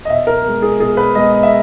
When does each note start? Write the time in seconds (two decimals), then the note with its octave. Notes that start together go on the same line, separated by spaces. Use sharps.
0.05 D#5
0.10 B2 E5
0.27 A#4
0.44 G#3 B3
0.62 G#4
0.80 B2 G#4
0.97 B4
1.15 G#3 B3 D#5
1.32 D#5
1.43 E5